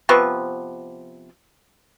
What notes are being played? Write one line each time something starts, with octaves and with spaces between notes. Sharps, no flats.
C3 F3 B3 C#6